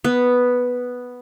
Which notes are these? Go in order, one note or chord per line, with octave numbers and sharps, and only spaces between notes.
B3